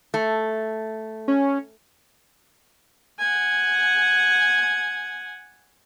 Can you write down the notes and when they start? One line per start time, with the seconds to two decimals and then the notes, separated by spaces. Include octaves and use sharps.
0.14 A3
1.28 C#4
3.19 F#5 G#5